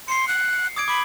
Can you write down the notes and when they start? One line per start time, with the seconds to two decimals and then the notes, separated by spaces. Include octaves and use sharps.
0.08 C6 C7 C#7
0.28 F#6
0.76 D6 D#6 G#6 D7
0.88 B5 D6